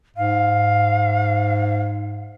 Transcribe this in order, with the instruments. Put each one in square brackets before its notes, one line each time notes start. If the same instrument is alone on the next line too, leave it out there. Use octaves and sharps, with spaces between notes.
[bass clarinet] G#2 [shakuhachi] F5